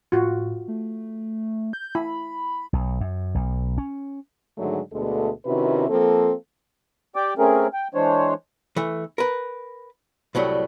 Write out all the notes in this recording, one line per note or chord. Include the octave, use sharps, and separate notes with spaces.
A2 F4 F#4
A3
G6
E4 B5
B1
F#2
B1
C#4
G#2 D3 D#3 F#3 G#3 A3
D2 B2 G#3 A3 D4 A4
C3 D#3 C#4 E4 F#4 B4
F3 A#3 C4 A4
G4 D5 G5 D6
A3 C4 C#4 G#4 A#4
G5
E3 G#3 D4 C5 C#5
E3 A3
A#4 B4
C2 A2 F#3 G3